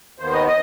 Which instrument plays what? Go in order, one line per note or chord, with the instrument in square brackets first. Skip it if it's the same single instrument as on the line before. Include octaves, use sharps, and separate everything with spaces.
[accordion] D#2 D#3 B3 C5
D#5
D#5